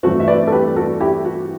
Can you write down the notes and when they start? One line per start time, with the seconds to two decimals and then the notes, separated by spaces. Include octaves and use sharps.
0.03 G2 E3 A3 C4 F#4
0.20 E5
0.28 B4 D5
0.47 A4
0.52 G4 B4
0.76 F#4 A4
1.00 E4 G4
1.25 F#4